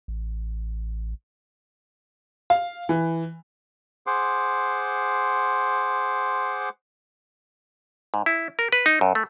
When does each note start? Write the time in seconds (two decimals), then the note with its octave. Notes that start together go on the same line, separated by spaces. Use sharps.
0.08 A1
2.50 F5
2.89 E3
4.07 G#4 C5 F#5 C6 D6
8.14 G#2
8.26 E4
8.59 A#4
8.72 B4
8.86 D#4
9.01 F#2
9.15 A3